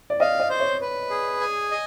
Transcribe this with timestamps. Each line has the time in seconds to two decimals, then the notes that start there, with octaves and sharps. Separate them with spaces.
0.10 D5
0.20 D#5 F5
0.40 D#5
0.50 C5
0.60 C#5
0.81 B4
1.10 G#4
1.41 G#5
1.71 D#5